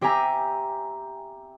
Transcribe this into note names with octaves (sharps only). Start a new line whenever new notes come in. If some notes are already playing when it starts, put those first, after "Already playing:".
C4 G4 E5 G#5 A#5